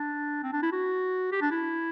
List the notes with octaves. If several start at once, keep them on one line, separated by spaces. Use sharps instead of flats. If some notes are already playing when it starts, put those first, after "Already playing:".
Already playing: D4
C4
D4
E4
F#4
G4
D4
E4